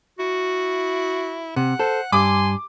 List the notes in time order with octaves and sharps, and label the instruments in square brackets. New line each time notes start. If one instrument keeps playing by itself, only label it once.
[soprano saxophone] E4 [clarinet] F#4
[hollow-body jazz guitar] C3 [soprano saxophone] F#5
[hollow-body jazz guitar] A4 [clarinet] C5
[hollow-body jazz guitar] G2 [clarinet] G#5 [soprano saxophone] C6 [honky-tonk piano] D6